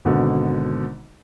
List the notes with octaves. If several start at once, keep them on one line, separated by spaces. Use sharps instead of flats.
G#1 B2 D3